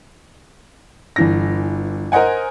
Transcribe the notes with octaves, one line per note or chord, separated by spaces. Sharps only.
G1 E3 A#6
A#4 C5 D#5 F#5 G#5